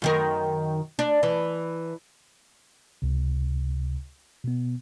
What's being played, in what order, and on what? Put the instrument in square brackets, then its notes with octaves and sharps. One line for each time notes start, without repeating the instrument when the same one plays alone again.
[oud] F#2 D#3 A#4
D4
E3
[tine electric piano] C#2 C3
B2 B3